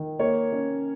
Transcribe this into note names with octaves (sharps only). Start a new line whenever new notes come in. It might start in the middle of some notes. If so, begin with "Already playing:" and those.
Already playing: D#3
A#3 C#5
C#4